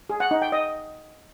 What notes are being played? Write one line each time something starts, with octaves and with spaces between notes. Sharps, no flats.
G#4
F#5
D#4
G5
D#5